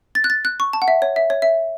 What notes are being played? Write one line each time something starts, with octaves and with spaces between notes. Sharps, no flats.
A6
F#6
A6
F#6
C#6
A5
F#5
E5
C#5
E5
C#5
E5